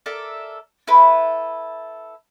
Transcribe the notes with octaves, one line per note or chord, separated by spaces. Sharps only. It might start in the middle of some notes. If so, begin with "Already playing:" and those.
A4 A#4 D5 E5
E4 A4 B4